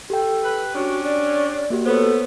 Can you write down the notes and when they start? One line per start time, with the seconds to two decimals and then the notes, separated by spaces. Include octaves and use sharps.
0.10 G4 A4 G5
0.43 B4
0.75 C#4 D4 F#4
1.03 D5
1.70 A#3 F#4 G4
1.86 B3 A4 C5 C#5